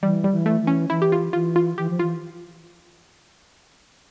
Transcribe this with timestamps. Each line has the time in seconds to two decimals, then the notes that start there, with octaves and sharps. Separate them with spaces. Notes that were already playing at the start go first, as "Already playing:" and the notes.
0.02 E3 G3
0.24 G3
0.31 E3
0.46 A3
0.61 E3
0.67 C#4
0.90 E3 E4
1.02 G4
1.12 F4
1.33 E3 F4
1.56 F4
1.77 E3 G4
1.90 F3
1.99 F4
2.02 E3